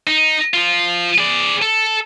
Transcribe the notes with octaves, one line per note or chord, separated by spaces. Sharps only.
D#4
F3 F4
G#4 D5
A4